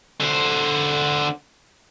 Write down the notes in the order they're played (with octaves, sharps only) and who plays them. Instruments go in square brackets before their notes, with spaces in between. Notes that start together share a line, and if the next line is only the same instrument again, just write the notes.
[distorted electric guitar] D3 C5